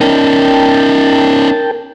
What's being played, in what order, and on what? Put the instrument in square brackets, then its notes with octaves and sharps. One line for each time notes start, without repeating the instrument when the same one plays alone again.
[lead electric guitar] C#4 D#4 [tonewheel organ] A#4 G5 A5